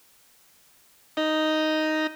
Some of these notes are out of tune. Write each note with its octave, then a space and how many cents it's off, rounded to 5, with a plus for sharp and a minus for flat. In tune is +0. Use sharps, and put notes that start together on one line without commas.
D#4 +0 D#5 +0